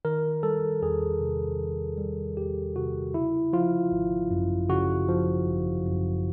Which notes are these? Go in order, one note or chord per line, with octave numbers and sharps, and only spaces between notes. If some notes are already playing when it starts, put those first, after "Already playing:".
D#3 A#4
G3 A4
E2 G#4
C3
D#3
G3
E2 G4
C3 F#4
C#3 E4
F3 F4
G#1
F#2
C#3 F#4
F3
G#1
F#2